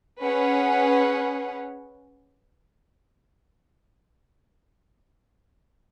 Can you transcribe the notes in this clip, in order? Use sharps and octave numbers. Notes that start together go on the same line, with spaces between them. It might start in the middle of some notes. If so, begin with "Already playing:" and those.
C#4 G#4 B4 F#5